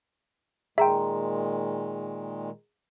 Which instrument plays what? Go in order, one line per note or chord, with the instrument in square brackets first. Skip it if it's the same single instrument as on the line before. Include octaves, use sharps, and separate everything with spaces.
[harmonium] A#2 D#3 G#3 [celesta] G#4 A#5 C6 [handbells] E5 G5